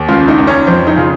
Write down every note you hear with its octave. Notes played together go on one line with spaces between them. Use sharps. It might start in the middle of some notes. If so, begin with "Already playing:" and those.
Already playing: D#2
C#2 F4
D#4
C#2
C#4
F2 C4
D#4
C#3 F4